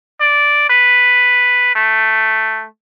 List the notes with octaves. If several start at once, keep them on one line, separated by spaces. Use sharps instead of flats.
D5
B4
A3